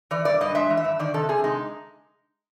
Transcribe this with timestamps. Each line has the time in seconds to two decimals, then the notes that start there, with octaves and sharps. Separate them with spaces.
0.11 E3 D5
0.25 G2 D5
0.41 G2 D#5
0.55 G#3 E5
0.70 E3
0.77 E5
0.85 G2
0.99 D#3 D5
1.14 C3 A4
1.29 C3 G#4
1.44 G#3 D#4